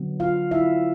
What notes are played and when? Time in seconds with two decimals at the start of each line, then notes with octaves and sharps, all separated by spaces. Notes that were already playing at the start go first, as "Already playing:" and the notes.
Already playing: D3 F#3 B3
0.20 F4 F5
0.51 E4 E5